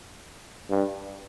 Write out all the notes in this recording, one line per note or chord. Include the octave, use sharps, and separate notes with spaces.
G2